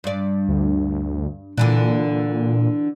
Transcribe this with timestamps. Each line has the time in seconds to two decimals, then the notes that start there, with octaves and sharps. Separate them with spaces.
0.04 G2 D5
0.49 D2
1.58 A#2 D3 E3 D4